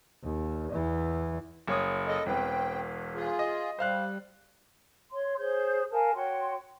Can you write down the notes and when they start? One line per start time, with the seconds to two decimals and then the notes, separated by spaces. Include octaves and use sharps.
0.24 D#2
0.74 E2 E3
1.67 F#1 C#5 D#6
2.08 A4 D#5
2.26 E1 E2 C4 B4 G5
3.15 F4 G#4
3.39 D#5
3.79 G3 C5 F5 F#6
5.11 C#5 C6
5.38 G#4 C5 C#5 G6
5.91 A#4 F5 G#5 A5
6.15 F#4 C#5 G5 C6